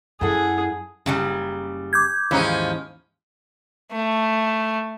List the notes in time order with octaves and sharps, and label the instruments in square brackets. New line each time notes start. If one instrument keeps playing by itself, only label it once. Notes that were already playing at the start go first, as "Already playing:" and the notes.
[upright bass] F#2 [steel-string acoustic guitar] E4 A4 F#5 [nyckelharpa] G#4
[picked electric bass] F#1 [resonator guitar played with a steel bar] C#3 F#3 G3
[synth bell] D6 G6 G#6
[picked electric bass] D#2 G#2 [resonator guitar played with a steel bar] E3 [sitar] F3 C#4 D#4
[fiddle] A3